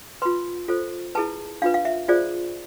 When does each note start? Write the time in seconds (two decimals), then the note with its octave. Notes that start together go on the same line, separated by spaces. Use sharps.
0.22 F4 B4 C6
0.68 F4 A4 C5
1.15 E4 G#4 B4 A5
1.62 D4 F4 B4 F5
1.74 F5
1.85 E5
2.08 F4 G#4 C5 D5